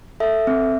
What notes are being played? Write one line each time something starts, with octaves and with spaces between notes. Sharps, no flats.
A4 E5
C4